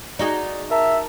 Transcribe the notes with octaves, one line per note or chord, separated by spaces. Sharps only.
D#4 F#4 G#4 D5
A#4 E5 A5 A#5